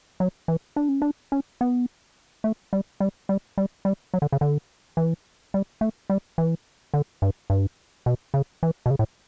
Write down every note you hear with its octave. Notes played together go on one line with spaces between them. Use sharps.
F#3
E3
D4
C#4
D4
C#4
B3
A3
G3
G3
G3
G3
G3
F#3
D3
C#3
D3
E3
G3
A3
G3
E3
D3
G2
G2
B2
C#3
E3
B2
C#3
A2